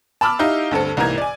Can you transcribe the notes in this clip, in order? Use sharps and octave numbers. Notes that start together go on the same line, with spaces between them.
A5 B5 D6 E6 F6
D#4 E4 G4 F5
D2 G2 C4 A4
C2 G#2 E3 A#3 A#5 G#6
D5 G#5